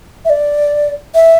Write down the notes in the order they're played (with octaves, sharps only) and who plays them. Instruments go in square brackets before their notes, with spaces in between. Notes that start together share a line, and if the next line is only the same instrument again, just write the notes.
[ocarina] E5
D5
E5